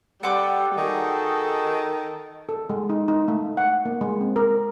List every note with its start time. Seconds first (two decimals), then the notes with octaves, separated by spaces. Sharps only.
0.23 G3 A4 B4 F#5 G5 D6
0.77 D#3 D#4 F#4 G#4 A4
2.49 A4
2.70 G#3
2.89 D#4
3.08 D#4
3.28 A3
3.57 F#5
3.85 A#3
4.01 G#3
4.21 C4
4.36 A#4